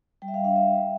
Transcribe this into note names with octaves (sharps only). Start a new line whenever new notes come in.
G3 G5
E5
F5
D4 F5
E5
G3